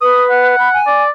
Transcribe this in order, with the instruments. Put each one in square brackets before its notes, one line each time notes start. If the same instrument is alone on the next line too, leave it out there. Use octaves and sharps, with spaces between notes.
[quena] B4 [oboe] D#6
[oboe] F#5
[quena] B5
G#5
[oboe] D5